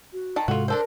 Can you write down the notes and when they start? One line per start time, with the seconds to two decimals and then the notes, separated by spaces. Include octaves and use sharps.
0.13 F#4
0.36 D#3 A5 A#5
0.48 G#2 C3 G#3 F4 F#4 A4
0.68 D4 A4 A#4 C5